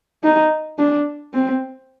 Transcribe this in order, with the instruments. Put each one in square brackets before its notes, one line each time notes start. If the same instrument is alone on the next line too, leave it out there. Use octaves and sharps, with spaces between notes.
[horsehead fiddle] D#4
D4
C4